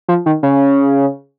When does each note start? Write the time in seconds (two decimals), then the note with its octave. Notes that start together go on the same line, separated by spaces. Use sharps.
0.08 F3
0.26 D#3
0.43 C#3